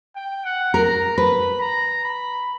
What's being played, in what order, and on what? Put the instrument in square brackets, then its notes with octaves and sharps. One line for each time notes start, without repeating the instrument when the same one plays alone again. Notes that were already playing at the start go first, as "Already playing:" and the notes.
[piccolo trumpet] G5
F#5
[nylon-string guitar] A#4 [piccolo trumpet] A#5
[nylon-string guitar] B4 [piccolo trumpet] B5
[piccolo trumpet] A#5
B5